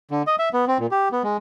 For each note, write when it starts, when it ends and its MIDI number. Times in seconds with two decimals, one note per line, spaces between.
0.11 0.22 50
0.27 0.36 75
0.39 0.49 76
0.53 0.65 59
0.67 0.78 60
0.79 0.87 46
0.91 1.09 67
1.12 1.22 59
1.24 1.37 56